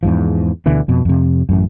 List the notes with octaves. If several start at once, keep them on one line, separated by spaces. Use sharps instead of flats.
E2 G#2 F3
D2 B2 D3 E3
F2 B2
F2 C3
A1 F#2